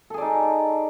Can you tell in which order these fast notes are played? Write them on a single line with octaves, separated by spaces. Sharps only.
A4 G#4 D5 D#4